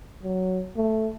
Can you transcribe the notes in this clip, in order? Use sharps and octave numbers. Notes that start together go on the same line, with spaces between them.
F#3
A3